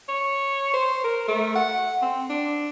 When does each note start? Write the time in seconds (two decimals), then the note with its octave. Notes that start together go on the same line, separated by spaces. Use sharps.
0.09 C#5
0.74 C5
1.04 A#4
1.28 A3
1.55 F#5
2.02 C4
2.29 D4